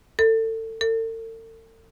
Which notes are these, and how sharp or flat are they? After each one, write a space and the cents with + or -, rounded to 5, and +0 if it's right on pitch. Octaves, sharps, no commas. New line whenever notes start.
A4 +30
A4 +45